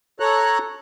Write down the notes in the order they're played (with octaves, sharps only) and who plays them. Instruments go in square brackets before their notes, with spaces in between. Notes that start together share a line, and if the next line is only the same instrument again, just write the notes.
[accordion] A4 C#5 A#5 F#6